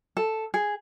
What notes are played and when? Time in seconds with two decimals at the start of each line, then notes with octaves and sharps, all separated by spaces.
0.17 A4
0.54 G#4